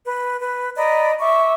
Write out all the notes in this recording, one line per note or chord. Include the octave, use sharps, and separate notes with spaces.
B4
B4
D5 D#5 A#5 B5
E5 C#6 D6